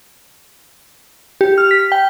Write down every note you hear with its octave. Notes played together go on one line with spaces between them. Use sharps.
G4
F6
B6
G5